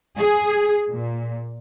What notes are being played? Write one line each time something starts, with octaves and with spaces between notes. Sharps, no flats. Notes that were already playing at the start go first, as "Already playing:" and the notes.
G#4
A#2